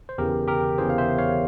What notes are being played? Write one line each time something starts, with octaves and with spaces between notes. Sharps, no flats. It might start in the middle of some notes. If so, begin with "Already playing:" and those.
C5
E2 C#3 E3 G4 A#4
G4 A#4
E2 C#3 E3 G#4 C5
F5
C5 E5
C#5 F5